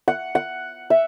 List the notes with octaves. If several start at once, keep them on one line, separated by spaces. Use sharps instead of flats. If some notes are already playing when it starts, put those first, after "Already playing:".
F#5
F#5
E5